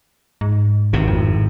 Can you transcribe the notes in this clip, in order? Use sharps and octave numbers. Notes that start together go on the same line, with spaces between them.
G#2
G#1 A2 C3
F2